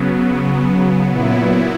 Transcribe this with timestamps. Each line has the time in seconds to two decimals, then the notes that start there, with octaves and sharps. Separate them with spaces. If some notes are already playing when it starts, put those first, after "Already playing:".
Already playing: C#3 F#3 B3
1.08 A#2 F#3 B3 E4